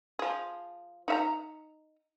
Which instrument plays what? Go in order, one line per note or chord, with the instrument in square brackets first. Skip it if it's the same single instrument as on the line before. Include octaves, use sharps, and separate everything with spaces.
[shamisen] F3 G#4
D#4 E5 A#5